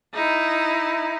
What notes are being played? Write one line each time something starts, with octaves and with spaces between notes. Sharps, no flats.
D#4 E4